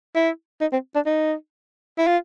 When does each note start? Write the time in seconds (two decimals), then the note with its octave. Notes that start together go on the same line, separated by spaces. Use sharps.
0.15 E4
0.61 D#4
0.72 C4
0.95 D4
1.06 D#4
1.98 E4
2.07 F4